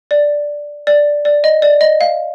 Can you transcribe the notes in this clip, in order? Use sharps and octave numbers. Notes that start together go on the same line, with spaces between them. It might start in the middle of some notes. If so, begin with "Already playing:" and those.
D5
D5
D5
D#5
D5
D#5
F5